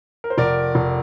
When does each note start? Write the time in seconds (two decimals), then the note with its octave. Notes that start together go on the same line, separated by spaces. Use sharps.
0.24 A#4
0.30 C5
0.38 F1 A#4 D5
0.75 F1